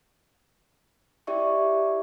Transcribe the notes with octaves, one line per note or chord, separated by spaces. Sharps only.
E4 G4 D5 E5 C#6